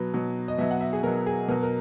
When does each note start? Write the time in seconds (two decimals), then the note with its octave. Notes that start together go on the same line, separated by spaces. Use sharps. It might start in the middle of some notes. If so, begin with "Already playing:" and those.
Already playing: B2 F#3 B4
0.14 B2 F#3
0.48 D#5
0.58 B2 F#3 E5
0.71 F#5
0.81 E5
0.93 G#4
1.03 B2 A#4
1.07 F#3
1.26 G#4
1.48 B2 A#4
1.51 F#3
1.63 A#4